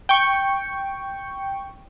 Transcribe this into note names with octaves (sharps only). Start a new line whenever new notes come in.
G5 C#6